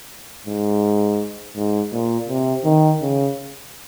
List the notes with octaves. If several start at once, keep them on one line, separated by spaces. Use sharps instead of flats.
G#2
G#2
A#2
C3
D#3
C#3